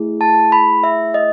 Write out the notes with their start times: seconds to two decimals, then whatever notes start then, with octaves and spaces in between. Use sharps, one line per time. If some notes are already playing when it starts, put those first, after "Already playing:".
Already playing: A3 E4 G#4
0.21 A5
0.52 B5
0.83 E5
1.14 D#5